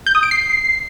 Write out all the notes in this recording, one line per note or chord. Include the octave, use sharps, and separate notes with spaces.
G6
D#6
D7
C7